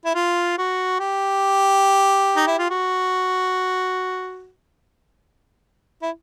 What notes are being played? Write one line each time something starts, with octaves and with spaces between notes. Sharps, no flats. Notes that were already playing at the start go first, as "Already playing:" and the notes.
E4
F4
F#4
G4
D#4
E4
F4
F#4
E4